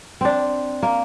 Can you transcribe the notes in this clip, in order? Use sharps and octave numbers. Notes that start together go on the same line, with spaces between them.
C4 D4
A#3